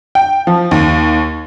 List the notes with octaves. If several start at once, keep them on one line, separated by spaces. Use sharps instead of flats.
G5
F3
D#2